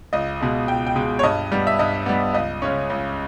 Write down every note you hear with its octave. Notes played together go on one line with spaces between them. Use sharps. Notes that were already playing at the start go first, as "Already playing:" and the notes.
C#2 D#5
B2 G#3
C#2 G5
G5
B2 G#3
C#5
G2 D#5
G3 B3
E5
G2 D#5
G3 B3
C#2 D#5
C#3 G#3 C#4
C#2